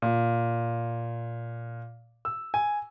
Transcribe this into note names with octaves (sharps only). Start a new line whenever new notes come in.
A#2
E6
G#5